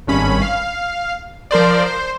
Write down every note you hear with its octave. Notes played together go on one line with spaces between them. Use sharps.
G#1 G2 C#4 B5
F5
F3 A#4 C5 D5
C5